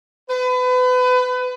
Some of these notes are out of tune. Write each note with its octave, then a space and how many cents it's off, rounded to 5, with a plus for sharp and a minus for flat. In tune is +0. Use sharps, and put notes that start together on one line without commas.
B4 +30